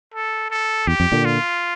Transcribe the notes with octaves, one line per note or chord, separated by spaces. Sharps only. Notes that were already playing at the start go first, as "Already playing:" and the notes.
A4
A4
E2 G4
F2
A#2 D3
F4